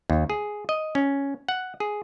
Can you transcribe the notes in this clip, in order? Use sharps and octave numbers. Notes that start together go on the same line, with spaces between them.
D#2
G#4
D#5
C#4
F#5
G#4